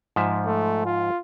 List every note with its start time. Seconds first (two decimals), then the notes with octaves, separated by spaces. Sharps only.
0.16 G#2 F3 E5
0.46 A3
0.86 F4